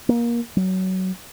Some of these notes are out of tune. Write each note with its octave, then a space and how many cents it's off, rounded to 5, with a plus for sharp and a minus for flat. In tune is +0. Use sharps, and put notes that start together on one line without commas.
A#3 +20
F#3 +20